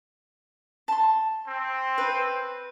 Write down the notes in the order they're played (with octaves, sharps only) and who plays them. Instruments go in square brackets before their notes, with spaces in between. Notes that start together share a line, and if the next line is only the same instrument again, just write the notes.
[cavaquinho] A5 C6
[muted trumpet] C4
[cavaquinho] B4